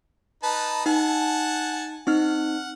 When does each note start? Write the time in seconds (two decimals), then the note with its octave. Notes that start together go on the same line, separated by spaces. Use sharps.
0.43 D#4 B4 A5
0.86 D#4 F#5 G#5 A5
2.07 C4 D#4 F#5 F6